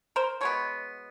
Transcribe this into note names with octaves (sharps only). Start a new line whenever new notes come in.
A#4 C5
B2 G#3 B3 C#5